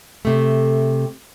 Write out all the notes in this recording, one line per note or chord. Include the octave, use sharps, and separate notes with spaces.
C3 A3